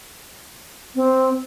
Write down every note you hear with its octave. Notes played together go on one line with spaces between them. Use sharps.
C4